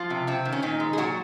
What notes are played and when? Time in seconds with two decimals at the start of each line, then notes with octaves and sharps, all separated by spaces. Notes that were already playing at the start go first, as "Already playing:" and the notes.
Already playing: F3 F4
0.10 C3
0.27 C3 C4
0.45 D#3
0.52 C#4
0.62 A#2 D#3 D#4
0.80 G#3
0.93 G#4
0.97 A#2 F#3 F#4